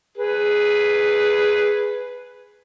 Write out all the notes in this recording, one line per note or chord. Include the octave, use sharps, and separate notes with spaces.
G#4 B4